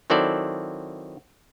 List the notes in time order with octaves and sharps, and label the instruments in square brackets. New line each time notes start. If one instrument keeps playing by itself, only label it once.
[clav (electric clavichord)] D#3 F#3 C4 E4 A4 D5